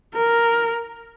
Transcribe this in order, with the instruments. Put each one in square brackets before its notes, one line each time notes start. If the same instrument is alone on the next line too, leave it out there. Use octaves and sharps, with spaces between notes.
[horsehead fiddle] A#4